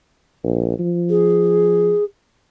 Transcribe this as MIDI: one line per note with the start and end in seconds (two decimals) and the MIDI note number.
0.44 0.79 34
0.79 1.93 53
1.10 2.04 68